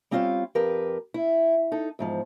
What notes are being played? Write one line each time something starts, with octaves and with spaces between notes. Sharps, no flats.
G3 C4 C#4 F4 E5 F5
F2 G4 A#4 B4
E4
D#4 A4
E2 G#2 F3